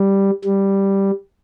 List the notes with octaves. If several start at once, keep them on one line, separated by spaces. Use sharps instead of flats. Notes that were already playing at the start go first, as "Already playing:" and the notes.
Already playing: G3
G3